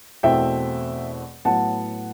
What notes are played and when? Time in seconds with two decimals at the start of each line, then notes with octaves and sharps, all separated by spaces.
0.23 E2 B2 A3 C4 E5 G5
1.45 A2 F#3 B3 F#5 A5